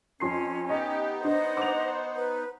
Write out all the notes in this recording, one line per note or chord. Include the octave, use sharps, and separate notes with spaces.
F2 C#4 C6 C7
B3 D#4 G4 D#5
D4 C5 D#5 F#5
D6 F7
B4